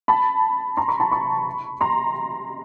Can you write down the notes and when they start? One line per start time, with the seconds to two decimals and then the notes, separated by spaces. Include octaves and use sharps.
0.08 A5 B5
0.77 A#5 C6
0.88 B5 C#6
1.00 A5 B5
1.11 B5 C#6
1.81 A#5 C6